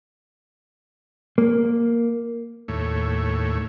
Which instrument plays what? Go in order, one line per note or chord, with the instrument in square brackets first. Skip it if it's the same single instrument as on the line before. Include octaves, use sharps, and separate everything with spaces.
[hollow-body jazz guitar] A#3
[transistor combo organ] D#2 A2 A3 C#5